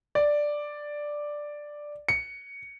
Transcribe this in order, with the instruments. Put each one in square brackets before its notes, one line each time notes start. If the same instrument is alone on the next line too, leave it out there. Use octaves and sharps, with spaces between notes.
[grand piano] D5
C#7